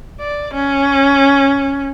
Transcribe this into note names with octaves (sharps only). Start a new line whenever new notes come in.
D5
C#4